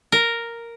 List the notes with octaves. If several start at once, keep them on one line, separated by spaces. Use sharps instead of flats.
A#4